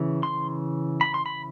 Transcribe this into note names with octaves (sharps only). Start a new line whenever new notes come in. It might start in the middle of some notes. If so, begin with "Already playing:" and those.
Already playing: C#3 E3
C6
B5
C6
B5